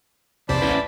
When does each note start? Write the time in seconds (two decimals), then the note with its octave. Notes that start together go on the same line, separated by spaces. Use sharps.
0.49 B1 E2 C3 C5 D5 A5 B5
0.62 C#4 E4 B4